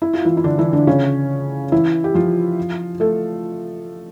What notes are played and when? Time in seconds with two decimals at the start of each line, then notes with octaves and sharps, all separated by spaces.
0.02 E4
0.13 F4
0.25 E3 E4
0.37 E4
0.44 D3 D4
0.58 E3 E4
0.73 D3 D4
0.87 C#3 C#4
1.72 E3 E4
2.04 G4
2.14 F3 F4
3.00 A3 A4